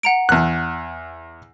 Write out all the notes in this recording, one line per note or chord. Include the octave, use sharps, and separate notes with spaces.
F#5 A#5 D7
E2 F#6